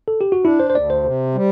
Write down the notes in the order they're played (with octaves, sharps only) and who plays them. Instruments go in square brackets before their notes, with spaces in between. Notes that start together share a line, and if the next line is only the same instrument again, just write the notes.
[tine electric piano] A4
G4
F#4
[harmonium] D4 [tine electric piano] E4
[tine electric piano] C5
C5
[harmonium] D2 [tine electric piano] D5
[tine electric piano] C5
[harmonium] C3
G3